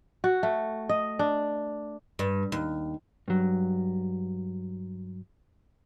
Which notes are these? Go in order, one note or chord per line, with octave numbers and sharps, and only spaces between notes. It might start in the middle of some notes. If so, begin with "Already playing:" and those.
F#4
A3
D#5
D4
G2
D#2
G2 F#3